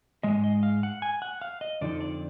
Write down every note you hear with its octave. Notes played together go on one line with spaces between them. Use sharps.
G#2 D#3 G#3 D#5
D#5
F5
F#5
G#5
F#5
F5
D#5
F2 D3 F3 D#4 D5
D5